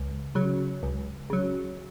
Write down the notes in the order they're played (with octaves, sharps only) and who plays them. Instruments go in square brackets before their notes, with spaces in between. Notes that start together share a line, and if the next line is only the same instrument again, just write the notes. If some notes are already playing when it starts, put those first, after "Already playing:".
Already playing: [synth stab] C#2
C#3 F#3
C#2
C#3 F#3